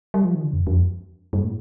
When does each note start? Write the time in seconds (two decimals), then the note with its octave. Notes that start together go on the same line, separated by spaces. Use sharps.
0.14 G3
0.25 F3
0.35 D#3
0.44 D3
0.53 F2
0.67 F2
1.33 G2
1.43 A2